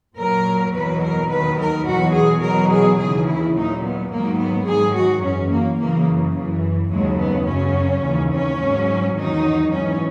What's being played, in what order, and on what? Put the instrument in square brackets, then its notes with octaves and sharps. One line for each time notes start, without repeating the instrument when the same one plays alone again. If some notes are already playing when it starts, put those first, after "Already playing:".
[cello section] A#2 F#3 A#4
E2 B2 F#3 B4
A#4
D#2 D#3 F#3 B4
A#4
E2 B2 F#3 F#4
G#4
E2 B2 F#3 A#4
G#4
D#2 C#3 E3 G#4
E4
A#2 F#3 D#4
B3
G#2 D#3 F#3 A#3
B3
G#2 D#3 F#3 G#4
F#4
F#2 E3 C#4
A#3
F#2 C#3 E3 A#3
F#2 E3
D#2 C#3 F#3 G#3
B3
F#2 C#3 F#3 C#4
D#2 C#3 E3
C#4
G#2 F#3
E2 D#3 F#3 D#4
G#2 E3 C#4